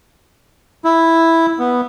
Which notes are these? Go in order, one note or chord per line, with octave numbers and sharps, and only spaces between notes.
E4
B3